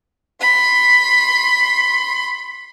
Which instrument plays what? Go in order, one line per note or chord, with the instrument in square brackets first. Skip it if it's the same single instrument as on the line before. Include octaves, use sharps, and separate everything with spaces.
[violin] B5 C6